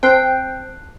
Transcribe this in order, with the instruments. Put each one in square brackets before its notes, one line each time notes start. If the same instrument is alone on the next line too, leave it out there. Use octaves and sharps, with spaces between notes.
[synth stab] C4 G5 [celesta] A5 F#6 C7